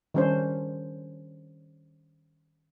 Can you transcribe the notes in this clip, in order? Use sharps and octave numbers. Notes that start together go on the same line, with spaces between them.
D#3 G3 C#4 D4 C5